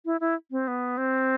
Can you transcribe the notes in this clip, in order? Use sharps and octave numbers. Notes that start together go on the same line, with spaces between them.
E4
E4
C4
B3
C4